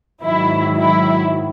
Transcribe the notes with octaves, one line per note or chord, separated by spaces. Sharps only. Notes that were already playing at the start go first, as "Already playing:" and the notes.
G#2 D#3 F#3 E4
E4